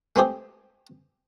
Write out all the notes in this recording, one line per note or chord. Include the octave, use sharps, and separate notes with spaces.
G#3 A3 C4 G4 G#4